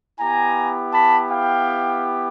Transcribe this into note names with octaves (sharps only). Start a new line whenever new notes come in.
B3 E4 G4 G#5 A#5
A5 B5
F5 G5